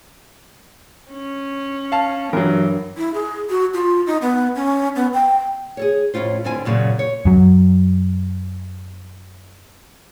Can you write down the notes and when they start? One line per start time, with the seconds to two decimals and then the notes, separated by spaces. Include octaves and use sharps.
1.11 C#4
1.92 F5 A5
2.33 G2 E3 F#3 A#4
2.97 E4
3.14 G#4
3.50 F#4
3.74 F4
4.07 D#4
4.22 B3
4.55 C#4
4.96 B3
5.14 G5
5.77 G#4 A4 C#5
6.14 F2 A2 C#4 F4 C5
6.44 G2 D3 C4 E4 G#5
6.65 F#2 A#2 C#3 F#3
6.99 C#5
7.25 F#2 F#3